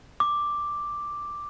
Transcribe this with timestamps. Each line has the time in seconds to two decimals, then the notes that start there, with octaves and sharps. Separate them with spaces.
0.20 D6